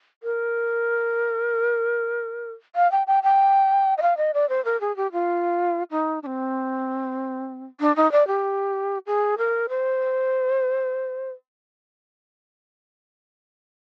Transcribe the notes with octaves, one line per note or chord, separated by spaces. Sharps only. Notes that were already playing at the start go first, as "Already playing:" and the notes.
A#4
F5
G5
G5
G5
D#5
F5
D#5
D5
C5
A#4
G#4
G4
F4
D#4
D4
C4
D4
D#4
D5
G4
G#4
A#4
C5